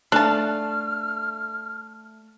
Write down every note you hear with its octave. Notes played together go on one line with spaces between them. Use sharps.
A3 D4 F5 A5 F6